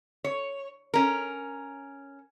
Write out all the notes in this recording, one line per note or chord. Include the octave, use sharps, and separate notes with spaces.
C#5
C#4 A#4